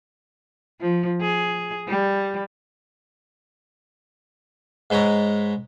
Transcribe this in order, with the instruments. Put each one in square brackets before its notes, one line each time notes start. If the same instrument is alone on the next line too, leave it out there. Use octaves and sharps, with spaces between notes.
[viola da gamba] F3
G#4
G3
[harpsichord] G#2 G#3 B4 C#5 A#5